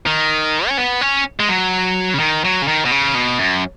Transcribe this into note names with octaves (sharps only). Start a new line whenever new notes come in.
D#3
C#4
B3
C#4
G#3
F#3
C#3
D#3
F#3
C#3
D#3
B2
C#3
B2
F#2